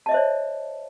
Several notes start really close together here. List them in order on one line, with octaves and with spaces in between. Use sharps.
A5 D#5 E5 C5 C#5